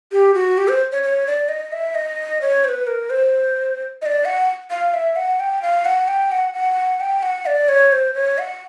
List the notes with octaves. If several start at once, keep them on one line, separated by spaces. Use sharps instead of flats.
G4
F#4
G4
C5
C#5
C#5
D5
D#5
E5
D#5
C#5
C5
B4
A#4
C5
D#5
D5
F#5
F5
E5
F#5
G5
F5
F#5
G5
F#5
F#5
G5
F#5
D5
C#5
C5
C#5
F#5